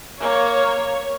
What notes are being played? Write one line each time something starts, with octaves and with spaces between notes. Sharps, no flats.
A#3 C#5